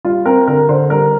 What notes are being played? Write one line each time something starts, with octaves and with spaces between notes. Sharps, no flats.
G3 F4
C4 A#4
D3 A#4
D3 C5
G3 A#4